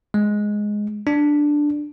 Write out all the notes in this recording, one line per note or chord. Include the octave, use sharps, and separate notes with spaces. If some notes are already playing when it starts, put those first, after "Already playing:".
G#3
D4